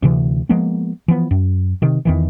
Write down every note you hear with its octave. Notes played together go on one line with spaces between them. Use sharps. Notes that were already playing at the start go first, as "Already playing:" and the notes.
D2 C3 E3
F3 G#3 A#3 B3
E3 F3 B3
F#2
C3 D#3
E2 D#3 E3